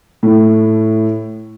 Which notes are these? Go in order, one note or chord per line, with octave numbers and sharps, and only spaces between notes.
A2